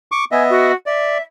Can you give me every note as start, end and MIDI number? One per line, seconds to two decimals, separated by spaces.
0.12 0.25 85
0.12 0.25 86
0.32 0.72 59
0.32 0.72 75
0.32 0.72 76
0.32 0.43 80
0.49 0.73 66
0.86 1.18 74
0.86 1.22 76